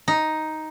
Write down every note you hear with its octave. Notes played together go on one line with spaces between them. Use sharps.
D#4